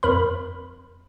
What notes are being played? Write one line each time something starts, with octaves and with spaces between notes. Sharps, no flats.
F2 A#4 B5